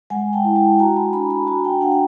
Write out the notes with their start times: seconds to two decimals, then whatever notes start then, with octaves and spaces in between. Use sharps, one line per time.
0.10 G#3 F#5 G#5
0.33 G5 A5
0.44 E4
0.56 G5 A5
0.79 F#4 G#5 A#5
0.96 A5 B5
1.13 D4 A5 B5
1.30 A5 B5
1.47 F#4 G#5 A#5
1.64 G5 A5
1.81 D4 F#5 G#5
1.92 F#5